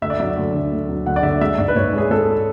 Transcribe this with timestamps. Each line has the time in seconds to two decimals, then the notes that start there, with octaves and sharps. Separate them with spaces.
0.02 D2 E5
0.10 D5
0.20 F#3 E5
0.37 D2
0.53 D3
0.72 D2
0.89 F#3
1.06 D2 F#5
1.16 D5
1.23 D3 E5
1.41 G#3 E5
1.58 G#2 D5
1.68 B4
1.76 G#2 C#5
1.93 G#3 G#4
2.11 G#3 A4